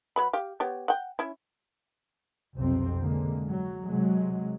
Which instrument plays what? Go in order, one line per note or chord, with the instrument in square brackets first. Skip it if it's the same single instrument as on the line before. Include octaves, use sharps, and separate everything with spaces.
[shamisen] F#3 B4 B5
G4 F5
B3 G4 C#5
F#5 G5
C#4 E4
[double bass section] B1 F2 C3 C4
D3 G#3 A#3
F#3
C3 F#3 G#3